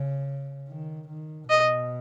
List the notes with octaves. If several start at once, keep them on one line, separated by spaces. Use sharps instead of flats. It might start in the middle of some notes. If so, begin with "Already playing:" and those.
Already playing: C#3
D#3
D#3
B2 D#5